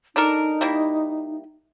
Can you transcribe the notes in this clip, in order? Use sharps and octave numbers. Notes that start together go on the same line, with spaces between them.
D4 D#4 A4 A#4
G3 A#3 E4